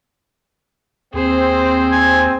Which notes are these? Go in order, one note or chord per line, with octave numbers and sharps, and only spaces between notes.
D#2 C4 G#4 C5
G#5